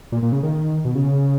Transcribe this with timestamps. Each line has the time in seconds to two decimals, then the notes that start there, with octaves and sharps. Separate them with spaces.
0.12 A#2
0.23 A#2
0.32 C#3
0.43 D#3
0.85 B2
0.95 C#3